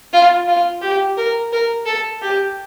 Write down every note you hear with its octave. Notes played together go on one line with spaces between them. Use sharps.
F4
F4
G4
A#4
A#4
A4
G4